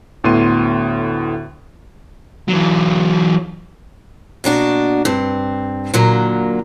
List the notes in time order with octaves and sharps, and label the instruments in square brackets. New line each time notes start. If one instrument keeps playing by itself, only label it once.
[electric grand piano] D2 A2 B3 C6 D#7
[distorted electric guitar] E3 F#3
[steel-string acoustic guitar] B2 A#3 D4 F#4
G2 C4
A#2 D3 F#3 A#3